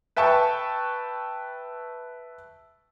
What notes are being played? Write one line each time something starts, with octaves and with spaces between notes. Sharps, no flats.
B4 E5 G5 A5 C#6